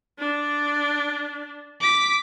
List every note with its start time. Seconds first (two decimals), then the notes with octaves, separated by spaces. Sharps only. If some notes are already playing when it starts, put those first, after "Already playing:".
0.19 D4
1.80 D6 B6